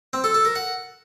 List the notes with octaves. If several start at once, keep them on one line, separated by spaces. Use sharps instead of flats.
C4
A4
A4
A#4
F#5